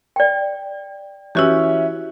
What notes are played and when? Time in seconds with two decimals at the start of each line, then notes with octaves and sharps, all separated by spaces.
0.16 D5 G5
1.35 E3 C#4 E4 F#4 G4 E5